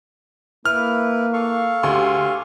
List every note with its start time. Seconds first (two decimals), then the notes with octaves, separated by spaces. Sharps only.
0.65 A#3 E4 B4 F6
1.33 A4 F5 C#6
1.83 D2 G4 G#4 C6